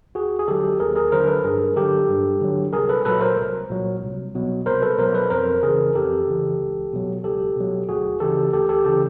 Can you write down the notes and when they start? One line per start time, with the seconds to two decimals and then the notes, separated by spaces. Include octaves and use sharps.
0.15 D#2 F#4 G#4
0.39 G#4
0.48 D3 F#3 G4 A4
0.80 D#2 G#4 A#4
0.95 G#4 A#4
1.12 D3 F#3 A#4 C5
1.28 A4 B4
1.44 G2 G#4 A#4
1.76 D3 F#3 G4 A4
2.08 G2
2.41 D3 F#3
2.73 C2 G#4 A#4
2.89 A4 B4
3.05 A#2 F#3 A4 B4
3.21 A#4 C5
3.37 C2
3.70 A#2 F#3
4.02 C2
4.35 B2 F#3
4.66 C2 A#4 C5
4.82 A4 B4
4.98 B2 F#3 A#4 C5
5.14 A4 B4
5.30 F2 A#4 C5
5.63 C#3 E3 G#4 A#4
5.95 F2 G4 A4
6.27 C#3 E3
6.60 C#2
6.93 B2 F#3
7.24 C#2 G4 A4
7.56 B2 F#3
7.89 D2 F#4 G#4
8.20 C#3 E3 G4 A4
8.53 D2 G4 A4
8.69 G4 A4
8.85 C#3 E3 G4 A4